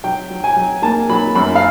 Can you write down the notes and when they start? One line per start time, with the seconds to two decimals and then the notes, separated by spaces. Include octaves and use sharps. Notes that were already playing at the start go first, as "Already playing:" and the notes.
0.04 F#3 G5
0.30 F#3
0.44 G#5
0.56 F#3
0.82 A#3 A5
1.09 F#3 B5
1.35 F#2 B5
1.55 F5